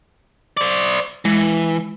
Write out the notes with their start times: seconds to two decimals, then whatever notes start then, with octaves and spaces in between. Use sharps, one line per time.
0.57 C5 D5
1.25 E3 G#3